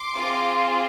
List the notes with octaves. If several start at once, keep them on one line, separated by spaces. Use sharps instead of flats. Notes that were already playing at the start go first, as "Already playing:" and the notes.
Already playing: C6 D6
C4 F4 G#4